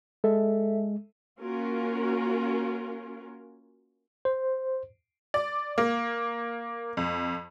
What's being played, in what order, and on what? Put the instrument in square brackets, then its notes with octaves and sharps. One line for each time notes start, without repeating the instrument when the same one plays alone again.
[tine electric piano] G#3 [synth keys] A4 E5
[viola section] A#3 C#4 F4 F#4 A#4
[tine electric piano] C5
[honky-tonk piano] D5
A#3
F2